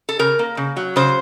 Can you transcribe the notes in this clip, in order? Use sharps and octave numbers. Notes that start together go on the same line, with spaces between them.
A4
C#3 A#4
A#3
C#3
F#3
C#3 C5